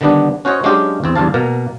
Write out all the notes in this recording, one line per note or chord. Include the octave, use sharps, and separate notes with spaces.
D3 D#3 G3 B3 D4
C#4 F#4 C5 C#5 D#5
F#3 G#3 C#4 D4 F4 G4
E2 C4
E2 G3 D4 F5 A5
B2 A#3 A#4